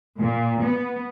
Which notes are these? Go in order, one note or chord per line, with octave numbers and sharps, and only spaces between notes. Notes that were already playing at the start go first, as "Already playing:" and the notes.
A#2
B3